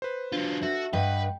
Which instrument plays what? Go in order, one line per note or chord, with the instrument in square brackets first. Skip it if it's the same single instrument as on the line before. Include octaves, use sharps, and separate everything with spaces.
[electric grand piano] B4 C5
[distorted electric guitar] F#3 F4 [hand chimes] D4
[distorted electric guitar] F#4 [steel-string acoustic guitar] A4 [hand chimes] E5
[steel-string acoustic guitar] G2 [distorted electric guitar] B4 [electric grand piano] D#5 F#5 [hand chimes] G5